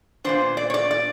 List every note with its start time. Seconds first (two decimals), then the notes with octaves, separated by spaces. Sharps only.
0.24 A#2 F#3 B3 D4 C5
0.57 D5
0.70 C#5
0.74 D5
0.91 D5